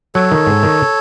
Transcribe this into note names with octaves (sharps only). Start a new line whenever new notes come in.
F#3 A4 C#5
D#3
G#2
D#3